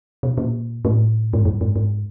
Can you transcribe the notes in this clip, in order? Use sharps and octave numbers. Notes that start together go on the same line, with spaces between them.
B2
A#2
A2
G#2
G2
G#2
G#2